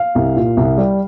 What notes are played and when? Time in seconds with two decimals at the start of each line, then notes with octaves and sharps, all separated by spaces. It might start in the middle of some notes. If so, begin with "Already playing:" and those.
Already playing: F5
0.15 C2
0.36 A#2
0.57 C2
0.78 G3